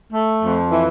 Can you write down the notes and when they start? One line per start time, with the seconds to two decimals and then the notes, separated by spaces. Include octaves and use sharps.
0.12 A3
0.42 F2
0.70 E3